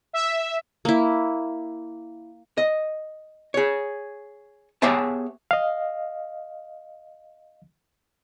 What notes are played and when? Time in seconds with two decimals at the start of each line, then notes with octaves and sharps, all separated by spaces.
0.13 E5
0.85 A#3 E4
2.58 D#5
3.54 G#4 C#5
4.82 B3 G4 G#4 C#5 E5 A5
5.51 D#5 F5